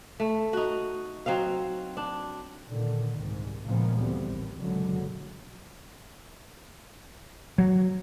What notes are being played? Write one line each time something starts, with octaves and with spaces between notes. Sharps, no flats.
A3
D#4 F#4
F#3 C4 D#4 F5
D4
A#2 D3 D#3
C2 G#2
A#2 C#3 F3 G#3 A#3 B3
D2 E3 G3 B3 C4
A1 D#2
F#1 F#2 B2 D3 F#3 G#3
F#3